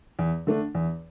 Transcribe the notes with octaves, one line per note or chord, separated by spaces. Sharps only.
E2
D3 A3 D4
E2